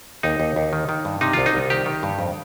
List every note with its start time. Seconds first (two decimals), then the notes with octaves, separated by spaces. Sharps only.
0.23 D#2 D#4
0.40 D#2
0.56 D#2
0.73 D#3
0.89 D#3
1.05 G2
1.21 C3 D#4
1.33 C2 F4
1.46 D#4
1.54 C2
1.70 D#3 G4
1.86 D#3
2.03 G2
2.19 F2